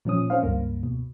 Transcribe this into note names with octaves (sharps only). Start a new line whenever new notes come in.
A#2 F3 C#4 D#6
C#4 C5 F5
C#2 G2 A#3
B2